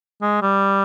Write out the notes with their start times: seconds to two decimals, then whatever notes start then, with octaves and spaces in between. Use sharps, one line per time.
0.22 G#3
0.42 G3